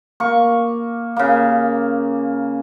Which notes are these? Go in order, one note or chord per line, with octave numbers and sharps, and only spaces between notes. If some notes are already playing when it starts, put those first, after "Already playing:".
A#3 C#6
C#3 A#3